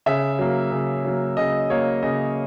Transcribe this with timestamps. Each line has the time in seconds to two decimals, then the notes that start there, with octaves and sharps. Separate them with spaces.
0.06 C#3 E5
0.39 F#3 A#3
0.71 C#3
1.04 F#3 A#3
1.37 C#3 D#5
1.69 F#3 A#3 C#5
2.03 C#3 D#5